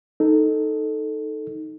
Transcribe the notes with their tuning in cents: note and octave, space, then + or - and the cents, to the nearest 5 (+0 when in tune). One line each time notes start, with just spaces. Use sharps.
D#4 +0 A4 +0